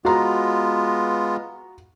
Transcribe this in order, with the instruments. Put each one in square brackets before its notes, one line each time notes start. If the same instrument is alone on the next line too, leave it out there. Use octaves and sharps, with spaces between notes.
[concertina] G#3 B3 F4 [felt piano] F#4 A#5